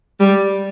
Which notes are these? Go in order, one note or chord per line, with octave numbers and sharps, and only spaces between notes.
G3